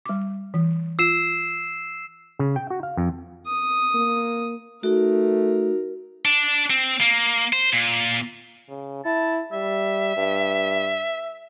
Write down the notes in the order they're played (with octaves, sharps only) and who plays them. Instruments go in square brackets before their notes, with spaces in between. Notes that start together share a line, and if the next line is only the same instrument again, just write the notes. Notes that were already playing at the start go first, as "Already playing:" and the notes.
[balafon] G3 D6
E3
[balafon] F4 [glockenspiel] E6 C7 E7
[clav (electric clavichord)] C#3
G5
F#4
F5
F2
[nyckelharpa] D#6
[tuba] A#3
[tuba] A3 [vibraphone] D#4 F#4 [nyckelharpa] A#4
[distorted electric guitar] D4
C4
A#3
C5
A#2
[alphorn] C#3
[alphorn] E4 [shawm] A5
[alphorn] G3 [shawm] E5
[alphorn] G2